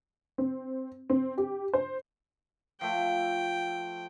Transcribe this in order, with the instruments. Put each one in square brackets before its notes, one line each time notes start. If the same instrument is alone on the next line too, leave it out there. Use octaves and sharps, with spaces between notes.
[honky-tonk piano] C4
C4
G4
C5
[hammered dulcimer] F3 A3 [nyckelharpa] G5